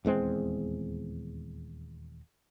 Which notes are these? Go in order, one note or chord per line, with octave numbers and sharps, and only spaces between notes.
D#1 E2 G#3 C4